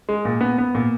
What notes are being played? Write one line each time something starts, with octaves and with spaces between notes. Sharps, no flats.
G#3
A#2
B3
B3
A#2